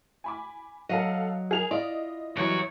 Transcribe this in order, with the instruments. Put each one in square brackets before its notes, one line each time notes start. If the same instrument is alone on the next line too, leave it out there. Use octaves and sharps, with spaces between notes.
[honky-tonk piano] G#5 B5 D6
[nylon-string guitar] F#3 D#5 [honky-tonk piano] A4 F5 F#5
[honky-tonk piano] G#4 A#4 F7
[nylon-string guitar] E4 F4 D5 [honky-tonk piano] D#5
[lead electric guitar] F#2 C#5 [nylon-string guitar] E3 F#3 G3